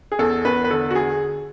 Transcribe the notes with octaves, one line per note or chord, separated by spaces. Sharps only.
G#4
E2 A4
E2 B4
B4
D3 A4
F#4
G#4